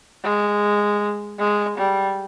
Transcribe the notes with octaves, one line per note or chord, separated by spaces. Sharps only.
G#3
G#3
G3